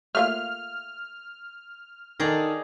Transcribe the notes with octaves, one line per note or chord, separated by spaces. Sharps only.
A3 A#3 F4 F6
D#3 D#4 G#4 A4 D5